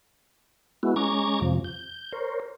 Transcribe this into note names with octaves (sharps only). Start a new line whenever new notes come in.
G#3 B3 E4 F#4
G#3 C#4 A#5 C#6 D6 G#6
F2 C3 F3
G6
A#4 C5 C#5